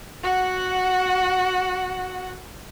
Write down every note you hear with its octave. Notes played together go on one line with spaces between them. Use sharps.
F#4 F#5